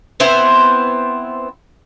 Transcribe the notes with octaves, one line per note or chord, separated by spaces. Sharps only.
B3 C4 E4 C5